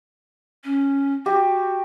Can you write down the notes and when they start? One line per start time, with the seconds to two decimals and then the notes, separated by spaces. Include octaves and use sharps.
0.64 C#4
1.26 F#4 G4